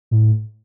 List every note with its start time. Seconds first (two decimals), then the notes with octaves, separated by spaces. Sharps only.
0.11 A2